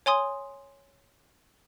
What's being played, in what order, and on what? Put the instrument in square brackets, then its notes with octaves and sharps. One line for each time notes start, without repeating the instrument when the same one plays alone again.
[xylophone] C#5 G#5 C6 D#6